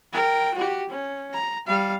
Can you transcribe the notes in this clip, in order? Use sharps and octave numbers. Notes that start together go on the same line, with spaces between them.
A#4 G5
F#4 G4
C#4
A#5
G3 F5